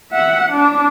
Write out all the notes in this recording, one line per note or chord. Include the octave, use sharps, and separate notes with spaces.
E5 F#5
D4